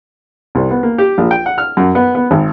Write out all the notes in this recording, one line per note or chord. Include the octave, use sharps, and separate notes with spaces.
C2
B3
A#3
G4
A#1
G5
F#5
F6
F#2
B3
B3
G#1